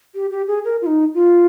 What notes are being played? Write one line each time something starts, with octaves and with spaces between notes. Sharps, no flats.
G4
G4
G#4
A#4
F4
D#4
F4